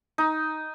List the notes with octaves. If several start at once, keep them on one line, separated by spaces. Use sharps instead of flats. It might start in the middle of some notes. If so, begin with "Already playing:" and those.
D#4